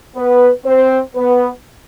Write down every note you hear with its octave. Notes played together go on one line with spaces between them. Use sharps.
B3 B4
C4 C5
B3 B4